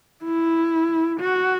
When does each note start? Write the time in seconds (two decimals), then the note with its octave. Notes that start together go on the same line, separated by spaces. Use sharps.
0.24 E4
1.21 F#4